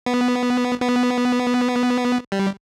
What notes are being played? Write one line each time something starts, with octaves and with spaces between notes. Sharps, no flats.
B3
B3
G3